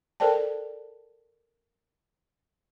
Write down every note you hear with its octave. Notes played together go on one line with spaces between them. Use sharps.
A4 A#4 C5 D5 G5 A5